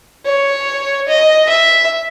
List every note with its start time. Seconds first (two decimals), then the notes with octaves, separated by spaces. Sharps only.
0.25 C#5
1.08 D#5
1.49 E5